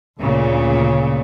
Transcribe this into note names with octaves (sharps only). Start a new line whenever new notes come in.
D2 A#2 C#3